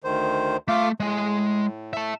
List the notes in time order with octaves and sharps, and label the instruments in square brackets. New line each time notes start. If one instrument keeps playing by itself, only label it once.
[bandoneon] D2 D#3 C5
[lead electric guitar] A3 [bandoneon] F4 F5 D6
[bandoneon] A2 [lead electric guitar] G#3 G#5
[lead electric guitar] E5 A5